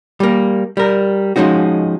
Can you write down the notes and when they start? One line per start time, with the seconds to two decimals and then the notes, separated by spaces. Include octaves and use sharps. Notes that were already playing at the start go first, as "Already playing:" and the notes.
0.20 G3 A#3
0.77 G3 A#4
1.36 F3 G#3 C#4 D#4 F#4